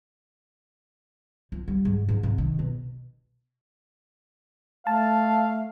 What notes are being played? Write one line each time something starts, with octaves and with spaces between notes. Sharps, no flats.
F3
G3
G#2
G#2
C3
D#3
B2
A3 F5 A5